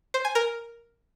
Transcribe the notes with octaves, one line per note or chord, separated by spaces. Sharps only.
C5
G#5
A#4